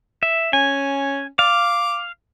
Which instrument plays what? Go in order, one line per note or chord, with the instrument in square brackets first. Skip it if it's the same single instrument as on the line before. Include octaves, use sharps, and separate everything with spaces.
[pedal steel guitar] E5
[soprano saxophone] C#4 [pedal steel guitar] G#5
[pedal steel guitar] F5 [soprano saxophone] D6